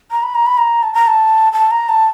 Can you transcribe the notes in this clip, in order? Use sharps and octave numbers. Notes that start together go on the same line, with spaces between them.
A#5
B5
A#5
B5
A#5
A5
A#5
A5
A5
A#5
A5